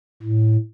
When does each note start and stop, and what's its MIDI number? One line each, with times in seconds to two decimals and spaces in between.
0.22 0.57 45